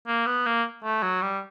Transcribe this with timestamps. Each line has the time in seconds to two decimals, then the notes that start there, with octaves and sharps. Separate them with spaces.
0.07 A#3
0.27 B3
0.46 A#3
0.84 A3
1.03 F#3
1.22 G3